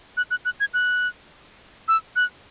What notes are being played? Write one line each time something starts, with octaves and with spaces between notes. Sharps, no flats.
F#6
F#6
F#6
G#6
F#6
E6
F#6